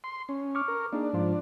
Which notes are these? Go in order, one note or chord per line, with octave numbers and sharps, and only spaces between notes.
C6
C#4
C#6 D6 F6
A#4
A#3 D4 D#4 G#4
G#2 F3 F4